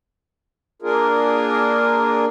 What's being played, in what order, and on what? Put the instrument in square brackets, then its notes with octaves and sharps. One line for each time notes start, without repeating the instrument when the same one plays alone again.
[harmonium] A#3 D4 F4 G#4 A#4